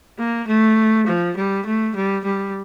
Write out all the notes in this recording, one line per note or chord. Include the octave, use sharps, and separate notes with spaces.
A#3
A3
F3
G3
A3
G3
G3